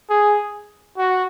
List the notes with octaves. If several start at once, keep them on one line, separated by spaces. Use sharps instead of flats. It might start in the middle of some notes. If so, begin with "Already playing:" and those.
G#4
F#4